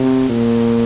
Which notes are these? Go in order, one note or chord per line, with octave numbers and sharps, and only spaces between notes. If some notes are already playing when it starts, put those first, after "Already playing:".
Already playing: C3
A#2